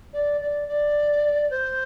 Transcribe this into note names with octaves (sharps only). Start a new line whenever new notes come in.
D5
D5
D5
C5